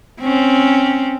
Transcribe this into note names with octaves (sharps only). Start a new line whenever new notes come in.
C4 C#4